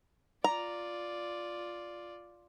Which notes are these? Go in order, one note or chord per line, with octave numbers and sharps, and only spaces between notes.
F4 D5 A#5